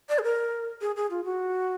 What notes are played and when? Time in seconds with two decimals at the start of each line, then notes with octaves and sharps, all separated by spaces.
0.09 D5
0.19 G#4
0.23 A#4
0.81 G#4
0.96 G#4
1.10 F4
1.25 F#4